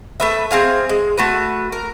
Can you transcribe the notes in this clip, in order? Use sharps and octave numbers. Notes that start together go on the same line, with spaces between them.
A3 B4 E5
C4 G#4 F5 G#5
G#3
A3 F#4 B4
A#4